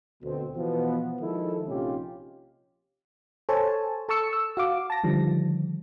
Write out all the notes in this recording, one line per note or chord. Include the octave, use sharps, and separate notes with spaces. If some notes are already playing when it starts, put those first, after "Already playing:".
D2 B2 C4
B2 E3 F3 B3
D#3 F3 G#3 E4 A4
A#1 C3 C#4 D#4 F4 G4
A4 C5 C#5 G#5 A5
A4 A5 C#6 E6 C#7
E6
F#4 F5 D6
A5 A#6
D3 D#3 F3 G3